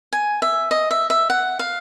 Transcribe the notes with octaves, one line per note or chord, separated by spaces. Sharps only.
G#5
E5
D#5
E5
E5
F#5
F5